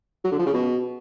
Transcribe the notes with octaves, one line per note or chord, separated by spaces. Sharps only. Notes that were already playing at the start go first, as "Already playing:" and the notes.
F#3
D3
F3
C#3
B2